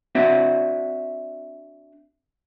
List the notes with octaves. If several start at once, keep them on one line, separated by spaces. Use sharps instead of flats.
C4 D4 F#4 E5